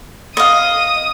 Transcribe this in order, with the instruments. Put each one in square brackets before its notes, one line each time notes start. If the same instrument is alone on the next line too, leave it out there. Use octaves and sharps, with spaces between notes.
[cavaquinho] D#5 F5 [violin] D#6